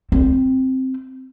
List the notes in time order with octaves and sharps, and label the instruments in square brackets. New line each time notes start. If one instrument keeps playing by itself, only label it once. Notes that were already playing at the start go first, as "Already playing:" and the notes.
[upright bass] C4